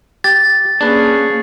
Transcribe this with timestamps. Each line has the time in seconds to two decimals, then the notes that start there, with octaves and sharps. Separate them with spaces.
0.24 G4 A6
0.81 A#3 C#4 D4 G#4 B4